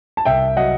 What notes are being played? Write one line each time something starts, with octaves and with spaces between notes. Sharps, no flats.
A5
C2 E5 G5
F#3 D#5 F#5